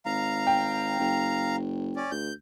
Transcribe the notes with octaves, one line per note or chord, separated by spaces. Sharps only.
G#1 F5 A#5
G5
F#1
C#4 D5
D2 G6